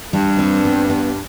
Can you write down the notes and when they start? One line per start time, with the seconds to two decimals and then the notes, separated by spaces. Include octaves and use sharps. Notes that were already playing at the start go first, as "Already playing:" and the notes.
0.13 G2 G3
0.39 C4
0.65 B3
0.89 B3